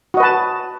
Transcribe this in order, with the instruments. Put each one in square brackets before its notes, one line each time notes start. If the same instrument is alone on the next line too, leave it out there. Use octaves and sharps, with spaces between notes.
[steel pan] F#4
D#5
B4
A5